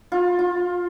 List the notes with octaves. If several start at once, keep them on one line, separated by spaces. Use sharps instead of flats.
F4
F4